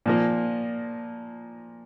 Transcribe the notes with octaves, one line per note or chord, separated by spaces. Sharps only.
A#2 F3 A#3